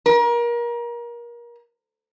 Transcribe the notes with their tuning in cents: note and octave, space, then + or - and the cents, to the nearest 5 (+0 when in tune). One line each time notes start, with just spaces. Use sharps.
A#4 +30